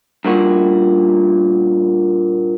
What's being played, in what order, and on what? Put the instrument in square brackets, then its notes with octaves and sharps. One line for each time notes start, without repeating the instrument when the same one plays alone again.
[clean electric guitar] G2 A#2 F#4